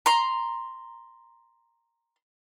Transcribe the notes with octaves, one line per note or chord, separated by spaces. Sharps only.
A#5 C6